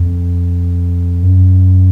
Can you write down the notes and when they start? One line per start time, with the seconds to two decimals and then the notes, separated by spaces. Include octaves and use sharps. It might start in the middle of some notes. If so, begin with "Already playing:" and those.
Already playing: F2
1.23 F#2